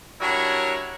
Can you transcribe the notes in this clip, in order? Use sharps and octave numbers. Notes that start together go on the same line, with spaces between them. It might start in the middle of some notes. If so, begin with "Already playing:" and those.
G3 D4 E4 F#4 A#4 C#5